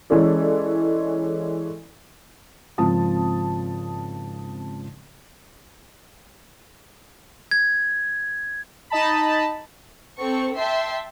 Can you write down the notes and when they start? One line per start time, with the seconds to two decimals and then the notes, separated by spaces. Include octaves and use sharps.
0.10 E3 G#3 C#4 A4 D5
2.78 G#1 C#3 F3 C4 A5 D#6
7.51 G#6
8.90 D#4 D#5 A5 B5
10.19 C4 A4 C#6
10.57 E5 G5 A5 C6